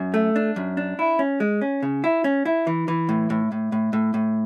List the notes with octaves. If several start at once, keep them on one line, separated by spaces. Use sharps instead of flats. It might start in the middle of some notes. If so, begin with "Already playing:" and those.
Already playing: F#2
A3
D4
F#2
D4
E4
C#4
G#3
C#4
C#3
E4
C#4
E4
E3
E3
A2
A2
A2
A2
A2
A2